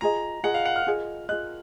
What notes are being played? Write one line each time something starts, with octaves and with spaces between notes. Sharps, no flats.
F4 G#4 D#5 A#5
F4 G#4 D#5 F#5
F5
F#5
F6
F4 G#4 D#5
F4 G#4 D#5 F#6